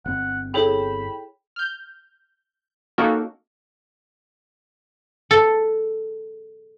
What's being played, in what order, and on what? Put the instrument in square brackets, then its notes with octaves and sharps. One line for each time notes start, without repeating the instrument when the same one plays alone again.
[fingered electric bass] G1 C4 [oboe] F#5
[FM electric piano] E4 G5 [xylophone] G#4 A4 C#5 [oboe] B5
[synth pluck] F6 G6
A#3 C#4 D#4 F#4 A4 A#4
[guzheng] A4